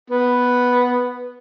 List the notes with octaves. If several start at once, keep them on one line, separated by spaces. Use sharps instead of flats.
B3